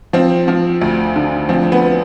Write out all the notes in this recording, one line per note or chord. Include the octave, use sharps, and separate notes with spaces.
F3 C4
F3
D2
D3
F3 C4
B3